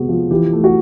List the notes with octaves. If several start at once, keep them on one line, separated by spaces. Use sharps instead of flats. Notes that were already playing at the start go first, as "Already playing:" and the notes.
Already playing: C3 G#3 B3 F#4
F3
E3 G4
A3
F#4